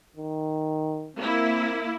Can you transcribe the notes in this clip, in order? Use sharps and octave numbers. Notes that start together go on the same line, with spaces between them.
D#3
A#3 C4 E4